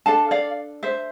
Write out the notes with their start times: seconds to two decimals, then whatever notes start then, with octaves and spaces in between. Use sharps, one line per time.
0.06 D4 A4 F5 A5
0.31 D5 F5
0.83 C5 E5